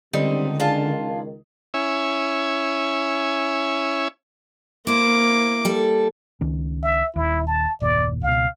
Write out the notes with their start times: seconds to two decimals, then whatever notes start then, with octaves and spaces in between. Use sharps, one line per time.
0.13 C#2 D3 D#3 G3 C4 D#4
0.60 D4 F4 G#4 A5
1.74 C#4 E4 C#5 E5 G#5
4.87 A#3 E4 C5 D6
5.65 G3 A4
6.41 C#2 D#3 C#4
6.83 E5
7.16 D#1 D#2 E4
7.47 A5
7.81 F#1 D#2 A#2 D5
8.23 C#2 B2 F5